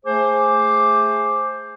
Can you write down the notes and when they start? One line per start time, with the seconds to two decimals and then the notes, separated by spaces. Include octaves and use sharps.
0.06 A3 G#4 C5 D6